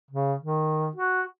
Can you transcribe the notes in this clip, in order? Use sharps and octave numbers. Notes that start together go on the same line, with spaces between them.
C#3
D#3
F#4